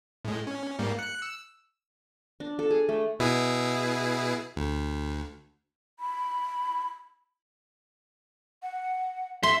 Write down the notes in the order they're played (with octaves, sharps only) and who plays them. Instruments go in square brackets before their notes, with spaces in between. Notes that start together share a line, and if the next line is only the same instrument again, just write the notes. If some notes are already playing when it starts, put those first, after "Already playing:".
[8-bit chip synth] A2 G#3
C#4
G#2 G3 A#3
F#6 C#7
E6
[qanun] D4
A4
G#4
A3
[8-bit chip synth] B2 E4 G#4
D2
[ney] B5
[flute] F#5
[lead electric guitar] E5 [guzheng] C6